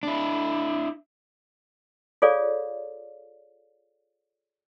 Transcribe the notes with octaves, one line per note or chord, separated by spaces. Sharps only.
D4 E4
F4 G#4 A4 C#5 D5 F5